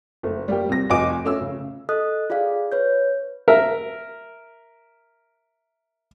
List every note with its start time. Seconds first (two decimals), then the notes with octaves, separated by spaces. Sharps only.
0.23 F#1 A3
0.48 G3 A#3 G4
0.69 C3 A#6
0.90 F1 D#5 G#5 D6 D7
1.25 A3 C#4 E6
1.41 C#3
1.89 A4 D#5 D#6 F#6
2.30 F4 G#4 D5 F5
2.72 B4 C#5 G6
3.48 A#4 E5